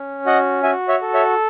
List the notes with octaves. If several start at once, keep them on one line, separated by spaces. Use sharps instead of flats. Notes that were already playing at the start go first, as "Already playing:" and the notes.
Already playing: C#4
F#4 D#5 F#5
F#4 E5 G#5
C#5 E5
A4
C#5 E5